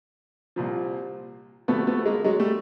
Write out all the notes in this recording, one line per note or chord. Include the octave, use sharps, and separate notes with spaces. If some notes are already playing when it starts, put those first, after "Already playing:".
C2 A#2 F3
D2 C3 F3 A3 B3
A3 B3
G#3 A#3
F#3 G#3
G3 A3